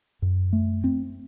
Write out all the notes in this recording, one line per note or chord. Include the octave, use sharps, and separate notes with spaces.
F#2
A3
C4